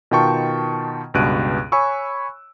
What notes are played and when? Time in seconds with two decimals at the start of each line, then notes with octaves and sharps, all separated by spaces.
0.11 B2 D#3 F4 G5 A5 C#6
1.14 C#2 G2 B2 F#6 D7 D#7
1.72 C#5 G#5 B5 C#6 E6